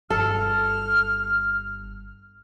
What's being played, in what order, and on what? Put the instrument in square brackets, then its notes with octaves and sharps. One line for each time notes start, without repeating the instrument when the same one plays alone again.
[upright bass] G1 [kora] A4 [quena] F6